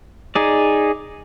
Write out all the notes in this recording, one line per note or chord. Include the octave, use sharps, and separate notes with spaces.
D#4 G#4 D5